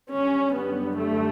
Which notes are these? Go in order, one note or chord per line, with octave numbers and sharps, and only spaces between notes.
F#2 D3 G3 C#4
B3
A3